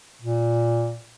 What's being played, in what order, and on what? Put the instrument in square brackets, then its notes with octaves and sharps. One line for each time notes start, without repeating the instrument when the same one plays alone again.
[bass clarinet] A#2